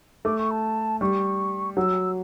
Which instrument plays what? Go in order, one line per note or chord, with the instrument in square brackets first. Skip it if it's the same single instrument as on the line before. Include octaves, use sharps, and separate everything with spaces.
[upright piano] A3 [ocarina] D6
[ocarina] C#6
A5
[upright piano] G3 [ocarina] C#6
[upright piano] F#3 [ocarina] E6